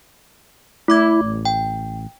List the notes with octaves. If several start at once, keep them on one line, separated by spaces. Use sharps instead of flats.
A3 E4 D6 G#6
A1
G5